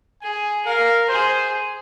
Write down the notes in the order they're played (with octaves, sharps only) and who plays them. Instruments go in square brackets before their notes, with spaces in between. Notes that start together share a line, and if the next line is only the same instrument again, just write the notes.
[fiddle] G#4 [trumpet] G#5
[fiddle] A#4 [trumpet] F5
[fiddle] G#4 [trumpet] C5